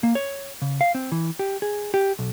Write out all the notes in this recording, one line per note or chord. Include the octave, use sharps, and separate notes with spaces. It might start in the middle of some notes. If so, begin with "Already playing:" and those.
A#3
C#5
C#3
F5
C4
E3
G4
G#4
G4
B1